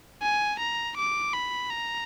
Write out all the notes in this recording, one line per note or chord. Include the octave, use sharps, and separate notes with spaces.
G#5
A#5
D6
B5
A#5